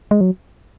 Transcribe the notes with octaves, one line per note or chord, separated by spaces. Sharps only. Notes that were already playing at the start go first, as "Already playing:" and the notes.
G#3
F#3